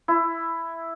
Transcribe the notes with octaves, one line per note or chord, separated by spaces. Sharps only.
E4